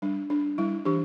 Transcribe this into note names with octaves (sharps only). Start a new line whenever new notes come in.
G3 D4
D4
G3 E4
E3 D4 G4